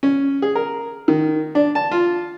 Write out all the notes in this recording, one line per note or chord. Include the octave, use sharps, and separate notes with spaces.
C#4
G#4
A#4
D#3
D4
A5
F4